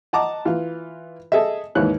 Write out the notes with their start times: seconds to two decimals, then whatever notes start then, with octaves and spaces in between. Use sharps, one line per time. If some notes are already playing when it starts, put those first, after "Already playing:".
0.13 D#5 F#5 A5 A#5 D6
0.45 E3 F4
1.32 G#4 A4 D#5 E5
1.75 D#2 G#2 D#3 E3 C#5 F#6